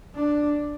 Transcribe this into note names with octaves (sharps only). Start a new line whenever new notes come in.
D4